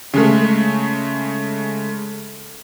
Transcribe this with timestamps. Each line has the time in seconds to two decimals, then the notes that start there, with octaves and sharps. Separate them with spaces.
0.14 C#3 G#3 A3